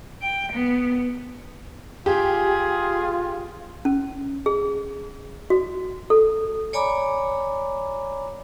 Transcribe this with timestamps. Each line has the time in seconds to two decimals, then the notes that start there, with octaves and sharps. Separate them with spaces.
0.22 G5
0.52 B3
2.06 F4 G4 G#4
3.85 C#4
4.46 G#4
5.50 F#4
6.10 A4
6.73 C#5 D5 G#5 A#5 B5 D6